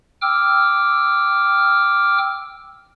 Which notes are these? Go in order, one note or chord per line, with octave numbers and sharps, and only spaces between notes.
G5 D6 E6 F6